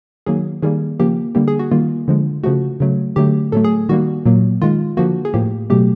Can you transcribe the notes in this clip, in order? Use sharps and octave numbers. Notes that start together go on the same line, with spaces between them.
D#3 F#3 A#3 G#4
D#3 G3 A#3 G#4
C#3 F3 A#3 G4
D3 G3 A#3 G4
G#4
F#4
D#3 G3 A#3 F4
D3 F3 G#3
C#3 F3 A3 F#4
C#3 F#3 A3
D3 F#3 A3 G4
A2 F#3 A3 A4
G#4
D#3 G3 A#3 F#4
A#2 F#3 A#3
D#3 G#3 F4
D3 F3 A#3 F#4
G#4
A2 F3 A#3 G4
B2 F#3 A3 G4